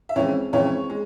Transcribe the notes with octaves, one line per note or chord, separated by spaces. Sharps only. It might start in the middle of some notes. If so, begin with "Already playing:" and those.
E5
F2 E3 G#3 C#4 C#5
F2 E3 G#3 C#4 C#5
G#3